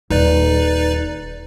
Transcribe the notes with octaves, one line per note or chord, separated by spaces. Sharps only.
D#1 D#4 B4 D5